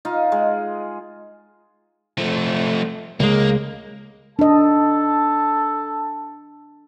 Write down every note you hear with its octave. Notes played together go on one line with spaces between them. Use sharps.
D#4 F4 F5
G#3
F3 A3
C#2 G#3 A#3
D4 A4 D#5 A5